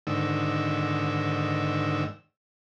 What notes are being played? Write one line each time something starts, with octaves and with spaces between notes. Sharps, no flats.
G#2 D3 D#3 E6